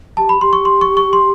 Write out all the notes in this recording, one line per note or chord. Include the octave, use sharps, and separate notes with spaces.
G4 A5
B5
G4 C6
C#6
C6
C#6
C#6
C6